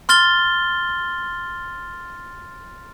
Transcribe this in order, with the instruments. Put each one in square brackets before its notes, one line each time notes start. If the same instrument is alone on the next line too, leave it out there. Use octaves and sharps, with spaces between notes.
[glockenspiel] C6 F6 A6 G7